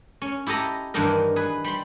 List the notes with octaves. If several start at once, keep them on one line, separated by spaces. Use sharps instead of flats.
C#4
E4 G4 A4 D#5 A#5
G2 D#3 E3 D4 D#4 A#4
G#4 B4
G3 B5 C6